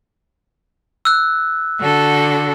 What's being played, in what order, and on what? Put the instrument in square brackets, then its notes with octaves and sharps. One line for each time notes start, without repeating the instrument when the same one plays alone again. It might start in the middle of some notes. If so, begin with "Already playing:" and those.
[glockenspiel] E6 F#6
[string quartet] D3 F#4 A4